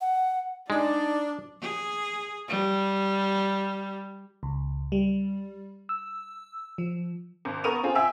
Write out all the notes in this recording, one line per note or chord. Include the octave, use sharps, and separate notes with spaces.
F#5
G#3 D4 D#4 D5
G#4
G3
C#2
G3
E6
F3
G#1
B3 A#4 C#6 D#6 D#7 F7
C4 F4 G#4
E5 G5 G#5 E6